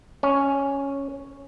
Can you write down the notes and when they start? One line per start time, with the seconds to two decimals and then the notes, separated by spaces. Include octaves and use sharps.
0.23 C#4